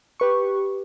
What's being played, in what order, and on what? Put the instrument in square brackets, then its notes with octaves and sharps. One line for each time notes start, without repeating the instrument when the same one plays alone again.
[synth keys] G4 B4 C#6